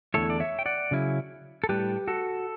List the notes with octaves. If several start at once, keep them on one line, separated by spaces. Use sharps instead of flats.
E2 D3 A3 E4 A4 C#5
D5
C#5 E5
G5
D5 F#5
C#3 F#3 C#4 E4
A4
A2 G3 D4 G4 B4
F#4 A4